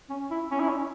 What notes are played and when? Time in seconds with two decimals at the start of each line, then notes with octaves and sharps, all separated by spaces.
0.10 C#4
0.31 E4
0.51 C#4
0.60 E4
0.69 C#4